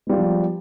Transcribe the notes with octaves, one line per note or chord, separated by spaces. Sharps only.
F3 G3 G#3 B3 F4